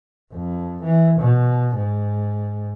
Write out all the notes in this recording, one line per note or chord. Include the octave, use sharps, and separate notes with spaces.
F2
E3
B2
G#2